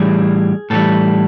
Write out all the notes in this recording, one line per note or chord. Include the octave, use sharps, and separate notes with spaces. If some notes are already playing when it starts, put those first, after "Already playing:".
Already playing: A2 E3 G3 G#4
A2 E3 G3 A4